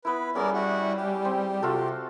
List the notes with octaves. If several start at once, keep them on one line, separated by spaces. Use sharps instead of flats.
B3 E4 B4
G3 B3 C#4 G#4 A#4 D5
E4 F#4 F#5
G4
C4
C3 F4 F#4 A4